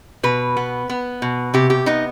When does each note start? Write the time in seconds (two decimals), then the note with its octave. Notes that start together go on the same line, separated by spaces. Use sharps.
0.23 B2 B4
0.57 B3
0.90 B3
1.22 B2
1.54 C3 G4
1.70 G4
1.86 B3 D#4